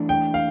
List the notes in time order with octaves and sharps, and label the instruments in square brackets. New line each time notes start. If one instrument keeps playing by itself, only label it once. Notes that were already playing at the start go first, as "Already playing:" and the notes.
Already playing: [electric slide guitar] E3 A3 D4
[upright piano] G5
F5